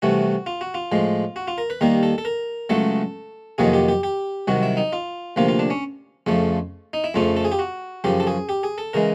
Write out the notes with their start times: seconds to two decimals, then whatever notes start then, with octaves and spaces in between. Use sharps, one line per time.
0.02 C2 C3 E3 A3 F#4
0.46 F4
0.61 F#4
0.74 F4
0.92 A2 F3 G#3
1.36 F#4
1.48 F4
1.58 A#4
1.70 B4
1.81 D#2 D#3 G3 A#3 A#4
2.03 A4
2.18 A4
2.25 A#4
2.69 C#2 C#3 F#3 A3 A4
3.58 F2 C3 D#3 F#3 A#3 G#4
3.73 G4
3.88 G4
4.03 G4
4.48 C2 C3 D#3 F#3 F#4
4.63 E4
4.77 D#4
4.93 F4
5.36 D2 C3 F3 A#3 F4
5.49 F4
5.59 D4
5.70 C#4
6.26 F2 C#3 F3 A3
6.93 D#4
7.04 E4
7.14 F2 C#3 F3 A3 F4
7.37 A4
7.45 G#4
7.52 G4
7.59 F#4
8.04 F#2 C#3 F3 G4
8.20 A4
8.27 G#4
8.49 G4
8.63 G#4
8.78 A4
8.93 C#3 E3 G#3 A#4